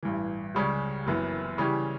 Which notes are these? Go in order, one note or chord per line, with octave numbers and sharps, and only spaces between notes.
A1 G2 E3
C#2 C#3 G3 C#4
F#1 F#2 E3 B3
C#3 E3 G3 C#4 G4